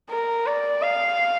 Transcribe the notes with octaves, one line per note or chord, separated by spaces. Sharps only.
A#4
D5
F5